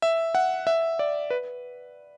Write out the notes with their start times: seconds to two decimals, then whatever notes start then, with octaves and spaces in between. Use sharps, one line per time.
0.02 E5
0.35 F#5
0.67 E5
0.99 D5
1.30 B4